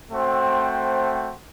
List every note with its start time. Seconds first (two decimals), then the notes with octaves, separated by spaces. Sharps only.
0.11 A3 C4 F#4 C5 G5